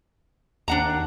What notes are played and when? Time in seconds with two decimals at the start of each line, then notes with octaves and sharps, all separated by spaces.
0.68 D#2 D4 F#5 A#5